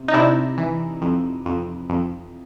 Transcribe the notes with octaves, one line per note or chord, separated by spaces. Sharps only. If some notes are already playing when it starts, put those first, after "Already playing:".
Already playing: C3
D#4
C3 D4 E4
E3
F2
F2
F2